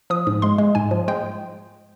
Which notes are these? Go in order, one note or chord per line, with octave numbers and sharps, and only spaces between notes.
F3 D#6
G#2
G#3 C6
G#3
G#2 G#5
F3
G#3 G5